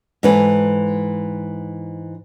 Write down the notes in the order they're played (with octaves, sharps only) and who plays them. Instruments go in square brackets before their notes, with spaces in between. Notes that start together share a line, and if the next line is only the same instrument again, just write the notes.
[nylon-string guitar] G#2 E3 A4